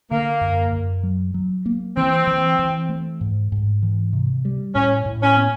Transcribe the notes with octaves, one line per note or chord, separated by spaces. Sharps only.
D3 A#3
F#2
F#2
F#3
F#3
A#3
E3 C4
E3
E3
A3
G#2
G#2
E3
C3
G3
A2 C#4
A2
C#4
B3